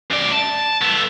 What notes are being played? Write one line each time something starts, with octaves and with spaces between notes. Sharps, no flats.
F#2 D5
A5
B3 A4